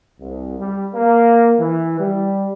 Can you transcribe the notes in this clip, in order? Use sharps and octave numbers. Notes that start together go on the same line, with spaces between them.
C2
G3
A#3
E3
G3